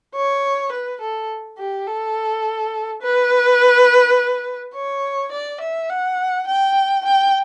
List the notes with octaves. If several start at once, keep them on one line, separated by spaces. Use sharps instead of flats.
C#5
B4
A4
G4
A4
B4
C#5
D5
E5
F#5
G5
G5